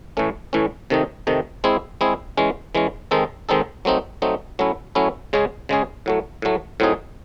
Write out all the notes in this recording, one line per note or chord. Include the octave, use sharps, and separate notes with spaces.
A2 E3 A3 C#4
A2 E3 A3 C#4
C3 D#3 A3 D#4
C3 D#3 A3 D#4
G#3 C4 E4 G#4
G#3 C4 E4 G#4
E3 G#3 C#4
E3 G#3 C#4
D#3 G#3 C4 D#4 A4
D#3 G#3 C4 D#4 A4
F#3 A3 C4 D#4
F#3 A3 C4 D#4
F#3 A3 C#4 E4
F#3 A3 C#4 E4
C#3 G#3 C#4 G#4
C#3 G#3 C#4 G#4
A2 F#3 A3
A2 F#3 A3
A2 F#3 C4 D#4 G#4